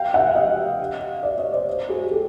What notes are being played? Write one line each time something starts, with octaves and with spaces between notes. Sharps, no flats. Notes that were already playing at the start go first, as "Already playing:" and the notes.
Already playing: F5 G5
E5 F#5
D#5 F5
D5 E5
C#5 D#5
C5 D5
F#4 G#4
G4 A4